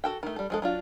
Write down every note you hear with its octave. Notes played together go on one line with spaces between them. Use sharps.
F#4 A4 G5
D#3 A3
G3 A4
F3 G#3 A4
F#3 D4 F4